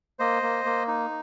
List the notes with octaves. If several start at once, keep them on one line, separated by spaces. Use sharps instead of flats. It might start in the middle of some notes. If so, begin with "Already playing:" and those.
A#3 C5 D#5
A#3
A#3
D#4